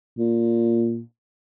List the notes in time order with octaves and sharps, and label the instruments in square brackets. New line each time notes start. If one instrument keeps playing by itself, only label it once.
[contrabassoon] A#2